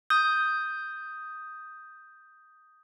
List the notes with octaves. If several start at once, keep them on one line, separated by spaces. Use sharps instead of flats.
D#6 G6